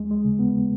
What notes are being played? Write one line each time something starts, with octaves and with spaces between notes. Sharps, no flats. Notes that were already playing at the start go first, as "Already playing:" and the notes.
Already playing: D#2 G#3
G#3
C#3
B3